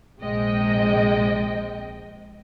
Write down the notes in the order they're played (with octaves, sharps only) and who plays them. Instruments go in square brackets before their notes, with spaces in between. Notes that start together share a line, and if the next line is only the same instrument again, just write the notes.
[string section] A#1 C3 G#3 D#5 G5